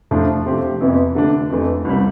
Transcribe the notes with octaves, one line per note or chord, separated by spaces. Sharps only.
A2 F3 A3 D4
C3 F3 A3 C4 G4
F2 C3 E3 B3 E4
D3 A3 D4
F2 E3 A3
C2 C3 G3